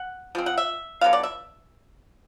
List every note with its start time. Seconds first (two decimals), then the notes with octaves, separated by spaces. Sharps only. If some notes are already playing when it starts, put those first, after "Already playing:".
Already playing: F#5
0.35 F3 G#3 C4
0.46 F#5
0.58 E5
1.01 D3 F#3 B3 F5
1.13 D5
1.23 E5